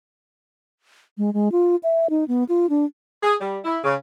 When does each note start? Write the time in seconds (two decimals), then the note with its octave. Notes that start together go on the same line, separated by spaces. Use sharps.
1.18 G#3
1.33 G#3
1.52 F4
1.83 E5
2.10 D#4
2.28 B3
2.49 F4
2.69 D4
3.23 G#4
3.41 G3
3.65 E4
3.84 C#3